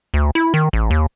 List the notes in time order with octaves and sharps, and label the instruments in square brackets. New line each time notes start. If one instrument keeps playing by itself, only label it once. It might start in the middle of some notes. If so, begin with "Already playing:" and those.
[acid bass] D2
E4
D#3
A1
D#2